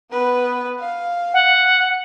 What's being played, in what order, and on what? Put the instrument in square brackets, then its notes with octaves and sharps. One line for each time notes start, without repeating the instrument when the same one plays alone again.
[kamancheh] B3 B4
F5
[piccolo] F#5